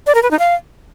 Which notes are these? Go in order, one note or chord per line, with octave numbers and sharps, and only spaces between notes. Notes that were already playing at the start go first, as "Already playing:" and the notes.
D5
A#4
B4
D#4
F5